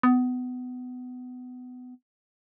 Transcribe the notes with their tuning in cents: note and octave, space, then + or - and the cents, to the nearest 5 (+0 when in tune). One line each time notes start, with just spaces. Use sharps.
B3 +25